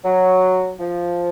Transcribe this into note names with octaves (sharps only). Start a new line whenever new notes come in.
F#3
F3